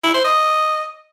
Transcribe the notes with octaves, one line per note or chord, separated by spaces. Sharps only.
E4
C5
D#5